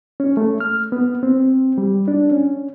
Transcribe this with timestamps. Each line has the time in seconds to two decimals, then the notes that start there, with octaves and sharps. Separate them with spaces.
0.20 C#4
0.37 A3
0.60 F6
0.92 B3
1.23 C4
1.78 G3
2.08 D4
2.31 C#4